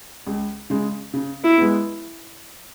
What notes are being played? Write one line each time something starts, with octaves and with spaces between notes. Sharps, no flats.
C#2
C#3 G#3
C#3
E4
G#3 B3